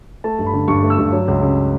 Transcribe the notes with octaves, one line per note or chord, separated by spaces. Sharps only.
A3 A5
G2
B5
D3
G2 C#6
A3
E6
G2
F#3
C#2
C#3